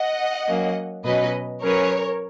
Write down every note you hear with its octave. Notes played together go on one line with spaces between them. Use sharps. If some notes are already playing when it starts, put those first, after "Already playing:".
Already playing: D#5 F#5
F#3 A#3 C#4
B2 F#3 C#4 B4 D#5
F#3 C#4 G#4 A#4 B4 C#5